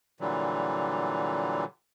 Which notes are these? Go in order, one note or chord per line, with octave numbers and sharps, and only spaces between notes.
A#2 D3 E3 F#3 G3